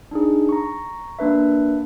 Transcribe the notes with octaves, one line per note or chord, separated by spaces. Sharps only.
D4 D#4 G#4
A#5 C#6
A#3 D4 B4 E5